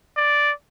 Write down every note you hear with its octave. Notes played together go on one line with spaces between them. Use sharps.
D5